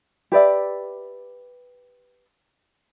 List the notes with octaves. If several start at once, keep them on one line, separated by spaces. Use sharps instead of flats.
G4 B4 D5 E5